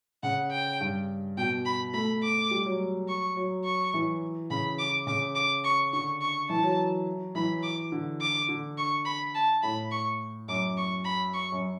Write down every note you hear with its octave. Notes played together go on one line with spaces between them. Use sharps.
C#3 F#5
G5
G2
B2 G5
B5
A3 B5
D6
G3
F#3
C#6
F#3
C#6
E3
C#3 B5
D6
C#3 D6
D6
C#6
D3 C#6
C#6
E3 A5
F#3
E3 B5
D6
D3
D6
D3
C#6
B5
A5
A2 B5
C#6
F#2 D6
C#6
B5
C#6
F#2